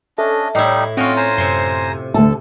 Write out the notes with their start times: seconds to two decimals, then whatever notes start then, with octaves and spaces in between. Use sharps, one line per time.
0.18 C#4 D4 A4 D#5 E5 A5
0.55 A2 G3 D#4 E4 G4 C#5 D#5
0.97 C4 C#4 F4 F#4 D#5 E5 G5
1.16 C5 G#5 A#5
1.38 F#2 C3 C6
2.14 D2 A4 E5 A5